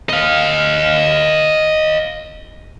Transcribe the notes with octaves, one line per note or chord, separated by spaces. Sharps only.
D#5 F5